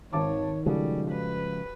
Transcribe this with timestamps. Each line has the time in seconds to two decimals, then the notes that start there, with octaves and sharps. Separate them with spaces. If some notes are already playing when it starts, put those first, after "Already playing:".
0.13 G#1 D#3 C#5 A5 D6
0.66 C#3 F3 G3 G#3 F#4 G4 A4
1.10 B4